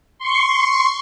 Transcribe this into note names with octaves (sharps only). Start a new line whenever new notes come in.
C6 C#6